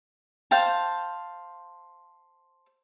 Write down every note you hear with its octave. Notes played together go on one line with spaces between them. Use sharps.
C5 F5 G5 A5